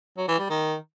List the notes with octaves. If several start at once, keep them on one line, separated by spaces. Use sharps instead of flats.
F#3
E3
G3
D#3